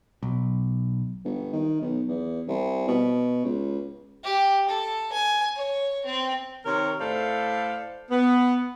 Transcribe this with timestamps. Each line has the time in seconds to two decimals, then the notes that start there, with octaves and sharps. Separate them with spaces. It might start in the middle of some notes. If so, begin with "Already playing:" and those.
0.23 B1
1.24 G1
1.52 D#3
1.81 B1
2.08 E2
2.47 C2
2.88 B2
3.45 C#2
4.24 G4
4.68 A4
5.12 G#5
5.55 C#5
6.05 C4
6.65 C3 D#3 A#4 C#5
7.00 A2 A4 C5 D5 E5 F5
8.11 B3